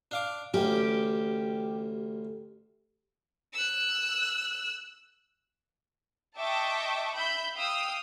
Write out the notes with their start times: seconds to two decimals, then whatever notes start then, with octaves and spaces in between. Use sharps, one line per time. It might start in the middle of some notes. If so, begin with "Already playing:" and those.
0.11 D4 F5 D6
0.54 A1 D2 C#4 G4
3.54 E6 F#6
6.38 D#5 E5 G5 A5 C#6 D6
7.13 E5 B5 G6
7.57 F5 G5 D#6 E6